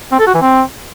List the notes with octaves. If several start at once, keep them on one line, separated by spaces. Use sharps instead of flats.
C4
A4
F#4
E3
C4